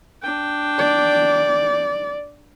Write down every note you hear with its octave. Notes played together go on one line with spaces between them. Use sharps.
D4 G5
D5